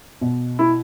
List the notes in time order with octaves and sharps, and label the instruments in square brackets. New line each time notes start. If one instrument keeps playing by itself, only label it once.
[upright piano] B2
E4